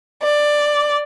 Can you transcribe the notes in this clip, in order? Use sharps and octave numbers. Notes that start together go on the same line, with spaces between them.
D5